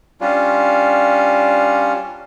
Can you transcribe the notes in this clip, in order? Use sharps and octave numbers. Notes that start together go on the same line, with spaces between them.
G3 C#4 D4 F4